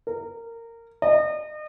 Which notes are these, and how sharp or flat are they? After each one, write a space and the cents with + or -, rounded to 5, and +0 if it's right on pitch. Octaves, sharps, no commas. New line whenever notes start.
A#4 -20
D#5 -35